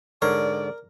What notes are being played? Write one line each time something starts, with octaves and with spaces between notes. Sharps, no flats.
G#2 D3 A#4 C#5 D5